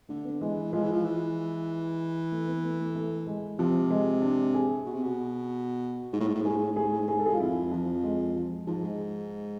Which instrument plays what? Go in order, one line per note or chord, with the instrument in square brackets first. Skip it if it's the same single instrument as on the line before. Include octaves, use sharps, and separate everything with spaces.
[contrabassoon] D3 [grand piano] A3
[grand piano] B3
[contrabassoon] E3 [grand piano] G#3
[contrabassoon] F3 [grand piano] G#3
[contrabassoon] E3
F3
E3
[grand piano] A3
B3
A3
A3
A3
G#3
[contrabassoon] C3 [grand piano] F3
[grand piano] G#3
D4
G#4
[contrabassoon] B2
C3
B2
G#2
A2
G#2
A2
G#2
[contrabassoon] A2 [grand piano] G#4
[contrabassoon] G#2
A2
G#2
[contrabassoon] A2 [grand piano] G#4
[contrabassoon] G#2
A2
G#2
[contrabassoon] A2 [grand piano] G#4
[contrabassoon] G#2 [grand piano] A4
[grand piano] G#4
F4
[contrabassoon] F2 [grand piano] E4
[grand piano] F3
G#3
F3
[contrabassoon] G#2 [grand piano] F3
[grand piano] G#3